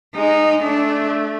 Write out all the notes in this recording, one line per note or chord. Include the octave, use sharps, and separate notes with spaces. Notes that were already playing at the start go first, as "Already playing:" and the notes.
G#3 D#4
A3 D4